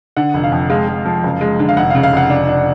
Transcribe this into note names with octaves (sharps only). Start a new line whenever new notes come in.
D3 F#5
F1
F5
F2
G#3 F5
G#3
F3
F#1
G#3
D3
F5
F1 F#5
F5
C#3
F5
F1 F#5
D4
D4